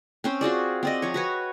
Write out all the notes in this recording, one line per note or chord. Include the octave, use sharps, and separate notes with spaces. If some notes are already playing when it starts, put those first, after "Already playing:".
C4 C#4 C5
F4 F#4 G#4 D5
C4 D5 D#5
F3 C#5
F#4 B4 C#5